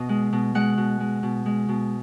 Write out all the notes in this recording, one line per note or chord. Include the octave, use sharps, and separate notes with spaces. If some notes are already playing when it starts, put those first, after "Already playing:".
Already playing: B2 D#5
G#3
B2
G#3 F#5
B2
G#3
B2
G#3
B2